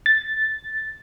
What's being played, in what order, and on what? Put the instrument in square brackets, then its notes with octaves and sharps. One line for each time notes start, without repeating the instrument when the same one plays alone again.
[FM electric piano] A6